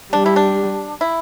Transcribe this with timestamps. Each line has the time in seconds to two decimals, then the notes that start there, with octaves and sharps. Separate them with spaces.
0.13 G3 D4
0.26 E4
0.36 D4
1.01 E4